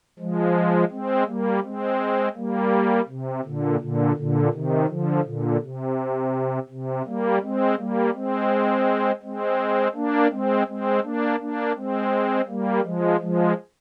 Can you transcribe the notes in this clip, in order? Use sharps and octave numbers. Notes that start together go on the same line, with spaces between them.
F3 G#3
G#3 C4
G3 A#3
G#3 C4
G3 A#3
C3
A#2 D3
A#2 D3
A#2 D3
C3 D#3
D3 F3
A#2 D3
C3
C3
G3 A#3
G#3 C4
G3 A#3
G#3 C4
G#3 C4
A#3 D4
G#3 C4
G#3 C4
A#3 D4
A#3 D4
G#3 C4
G3 A#3
F3 G#3
F3 G#3